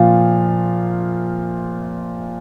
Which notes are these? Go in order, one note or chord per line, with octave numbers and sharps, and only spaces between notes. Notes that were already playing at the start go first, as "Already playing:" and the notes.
Already playing: A#2 F3 F5